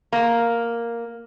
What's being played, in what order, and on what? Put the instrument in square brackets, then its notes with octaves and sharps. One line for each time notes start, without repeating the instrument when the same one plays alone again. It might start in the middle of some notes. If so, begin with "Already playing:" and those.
[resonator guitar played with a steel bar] A#3